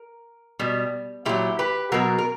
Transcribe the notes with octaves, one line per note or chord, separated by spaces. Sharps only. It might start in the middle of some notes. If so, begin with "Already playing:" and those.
Already playing: A#4
B2 G3
A#2 F#3 E4 G4
G4 B4
B2 F#3 F#4 A#4
A#4